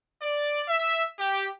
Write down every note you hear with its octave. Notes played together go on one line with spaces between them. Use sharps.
D5
E5
G4